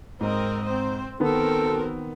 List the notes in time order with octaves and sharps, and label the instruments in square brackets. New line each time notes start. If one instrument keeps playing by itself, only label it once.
[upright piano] G#2 [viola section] C4 A#4 D#5
[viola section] C4 C5
[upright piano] D#3 B3 [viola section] C4 F#4 A#4 [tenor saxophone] A4